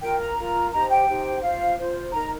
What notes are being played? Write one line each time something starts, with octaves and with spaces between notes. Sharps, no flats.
F4 A#4 G5
A#5
F4 A#4
D#4 G4 C5 A#5
G5
D#4 G4 C5
F4 C5 F5
F4 C5
D#4 A#4 A#5